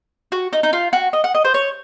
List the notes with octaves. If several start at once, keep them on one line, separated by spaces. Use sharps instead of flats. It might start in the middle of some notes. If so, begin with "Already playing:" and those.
F#4
D#4
D#4
F4
F#4
D#5
F#5
D#5
C5
C#5